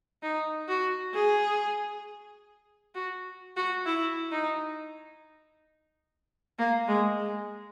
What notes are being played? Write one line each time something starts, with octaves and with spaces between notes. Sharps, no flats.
D#4
F#4
G#4
F#4
F#4
E4
D#4
A#3
G#3
G#3